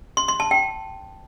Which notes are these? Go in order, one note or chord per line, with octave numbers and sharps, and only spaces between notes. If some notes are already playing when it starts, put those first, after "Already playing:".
C6
C6
A5
G5